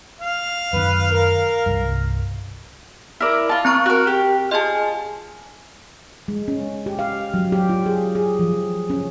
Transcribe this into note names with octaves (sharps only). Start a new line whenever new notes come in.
F5
F#2 D#3 B4
A#4
C2 G2
E4 A#4 D5
F4 A5
C4 A#5 C#6
F#4 A#4
G4
F4 G#4 D#5 A5
G#3
C#4
G4
F5
F#3
G4
F4
G#4
G#4
F3
C#4